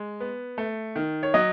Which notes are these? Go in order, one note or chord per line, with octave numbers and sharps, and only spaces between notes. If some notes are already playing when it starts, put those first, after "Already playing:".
Already playing: G#3
B3
A3
D#3
C#5
F#3 D#5